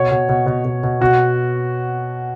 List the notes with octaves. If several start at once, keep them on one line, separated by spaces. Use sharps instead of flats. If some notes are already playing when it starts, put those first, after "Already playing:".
Already playing: B2 C#5
B2
B2
B2
B2
B2
B2 F#4